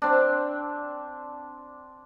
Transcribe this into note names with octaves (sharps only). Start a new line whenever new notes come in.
C4 D4